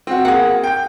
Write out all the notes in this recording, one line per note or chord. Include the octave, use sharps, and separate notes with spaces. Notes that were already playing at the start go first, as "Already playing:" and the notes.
C4 F#4
A#3 G#4 F#5
G5 G6